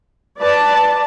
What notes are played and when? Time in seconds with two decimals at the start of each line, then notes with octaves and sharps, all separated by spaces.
0.39 B4 D5 A5